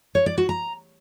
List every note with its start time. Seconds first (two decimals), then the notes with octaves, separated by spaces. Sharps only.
0.15 C#5
0.26 D5
0.38 F#4
0.49 A#5